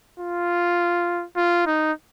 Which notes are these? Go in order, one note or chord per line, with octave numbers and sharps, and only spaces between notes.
F4
F4
D#4